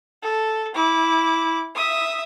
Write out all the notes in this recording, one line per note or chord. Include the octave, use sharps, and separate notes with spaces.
A4
E4 D6
E5 D#6